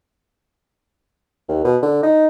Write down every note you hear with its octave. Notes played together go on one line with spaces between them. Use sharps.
D#2
B2
D3
D#4